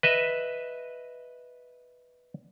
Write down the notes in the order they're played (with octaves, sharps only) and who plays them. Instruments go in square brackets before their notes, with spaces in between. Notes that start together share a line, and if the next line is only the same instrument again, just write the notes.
[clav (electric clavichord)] B4 D#5 E5